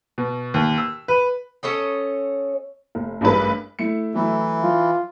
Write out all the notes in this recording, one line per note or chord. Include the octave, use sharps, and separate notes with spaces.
B2
D#2
E6
B4
C#4 A4 C#5 D#5
F1
A1 G2 G#3 A#3 B4
A3 E4 C#7
E3 F#3 A3 E4
F3 F4